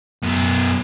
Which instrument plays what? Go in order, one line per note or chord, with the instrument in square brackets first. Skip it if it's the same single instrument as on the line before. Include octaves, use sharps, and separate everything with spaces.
[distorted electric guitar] F#2 B3